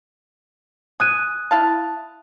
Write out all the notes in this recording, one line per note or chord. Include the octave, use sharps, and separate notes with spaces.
G#5 D#6 F#6 D#7
E4 F5 A5